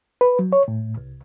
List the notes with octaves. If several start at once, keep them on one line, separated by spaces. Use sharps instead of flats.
B4
F#3
C#5
A2
C2